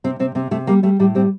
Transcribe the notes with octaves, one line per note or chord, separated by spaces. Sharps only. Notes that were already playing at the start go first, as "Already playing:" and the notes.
C3 C4
C3 C4
C3 C4
C3 A3
G3 A#3
G3 A3
A2 G3
G3 C4